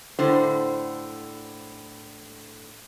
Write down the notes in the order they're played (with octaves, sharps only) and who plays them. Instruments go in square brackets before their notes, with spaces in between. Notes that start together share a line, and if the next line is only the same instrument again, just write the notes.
[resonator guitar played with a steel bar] A2 D3 C5